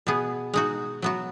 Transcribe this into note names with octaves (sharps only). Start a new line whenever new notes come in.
B2 B3 G#4
G#3 D#4 F#4
F#3 B3 F#4